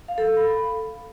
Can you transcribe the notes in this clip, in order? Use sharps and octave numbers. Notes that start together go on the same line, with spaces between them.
F5
A4
F5
B5